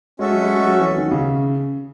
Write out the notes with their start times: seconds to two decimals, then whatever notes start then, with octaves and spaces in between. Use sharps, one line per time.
0.19 G#3 C#4 F#4 A4 E5
0.31 F#3
0.43 G#3
0.54 G#3
0.66 F#3
0.80 E3
0.97 D#3
1.11 C#3